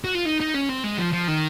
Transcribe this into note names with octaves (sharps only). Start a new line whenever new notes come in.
F#4
F4
D#4
D#4
C#4
C4
G#3
F3
F3
D#3